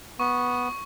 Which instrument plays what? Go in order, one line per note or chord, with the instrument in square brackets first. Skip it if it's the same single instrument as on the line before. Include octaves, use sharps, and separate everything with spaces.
[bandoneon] B3 [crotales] C#6